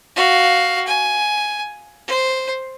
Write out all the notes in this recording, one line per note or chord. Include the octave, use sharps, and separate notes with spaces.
F#4 F5
G#5
C5